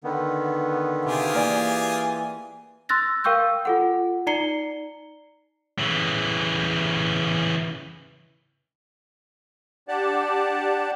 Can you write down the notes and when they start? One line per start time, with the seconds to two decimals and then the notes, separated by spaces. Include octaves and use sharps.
0.04 D3 D#3 B3
1.06 C3 F4 G4 G#4
1.35 E3 A#3 D5 G#5
2.89 C6 E6 F#6 A6 A#6
3.24 A#4 F5 G5 C#6 E6 G6
3.65 F4 A4 F#5
4.27 D#4 D5 A#5 C7 C#7 G7
5.79 C#3 E3
9.88 D4 G4 D5 F#5 A5